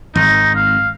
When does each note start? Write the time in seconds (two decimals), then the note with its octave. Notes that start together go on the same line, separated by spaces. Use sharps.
0.16 G#1 D#4
0.56 F5